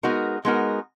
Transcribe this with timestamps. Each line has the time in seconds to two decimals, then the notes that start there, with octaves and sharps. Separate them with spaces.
0.03 G#3 B3 D#4 F#4 A#4
0.45 G#3 B3 D#4 F#4 A#4